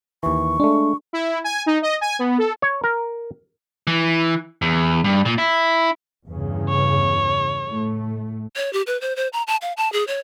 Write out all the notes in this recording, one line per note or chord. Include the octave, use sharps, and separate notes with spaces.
D#2 E3 C#6
G#3 A3 D4
E4
G#5
D#4
D#5
G#5
B3
A4
C#5
A#4
E3
E2
G2
A#2
E4
E2 G2 C#3
C#5
A2 A3
C#5
G4
B4
C5
C5
A#5
A5
F5
A5
G#4
C#5